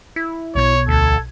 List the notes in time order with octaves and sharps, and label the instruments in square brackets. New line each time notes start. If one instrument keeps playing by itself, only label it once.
[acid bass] E4
[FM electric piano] B1 B2 G#6 [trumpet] C#5
[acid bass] D2 [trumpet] A4